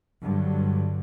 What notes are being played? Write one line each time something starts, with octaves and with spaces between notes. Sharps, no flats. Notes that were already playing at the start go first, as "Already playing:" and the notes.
G2 D3 F#3